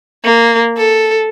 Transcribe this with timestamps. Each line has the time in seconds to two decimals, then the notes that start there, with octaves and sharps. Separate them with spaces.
0.25 A#3
0.78 A4